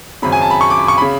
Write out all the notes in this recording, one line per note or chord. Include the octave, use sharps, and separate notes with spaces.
G#1 F#2 C#3 B5
G#5
A5
B5
C#6
D6
C#6
C#3 B5